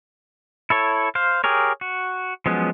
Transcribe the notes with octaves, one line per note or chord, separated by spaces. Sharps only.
E4 A4 C#5
C5 F5
G4 G#4 A#4 C#5
F#4
F3 F#3 G#3 B3 C#4